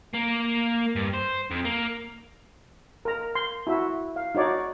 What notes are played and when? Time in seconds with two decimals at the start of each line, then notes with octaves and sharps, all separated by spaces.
0.14 A#3
0.96 G2
1.14 C5
1.51 F2
1.65 A#3
3.05 A#4 A#5
3.35 C6
3.67 E4 F#4 E5
4.16 F5
4.35 D#4 F#4 C#5 D5